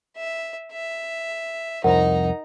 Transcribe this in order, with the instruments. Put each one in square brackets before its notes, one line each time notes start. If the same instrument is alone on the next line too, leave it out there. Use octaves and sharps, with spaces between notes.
[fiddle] E5
E5
[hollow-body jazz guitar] C2 F2 [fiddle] D#4 A#5 [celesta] A#4 F#5